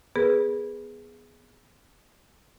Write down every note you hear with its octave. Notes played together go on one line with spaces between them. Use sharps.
B3 G#4 A#4 B4